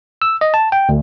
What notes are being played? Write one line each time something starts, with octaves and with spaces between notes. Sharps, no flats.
E6
D#5
A5
G5
D2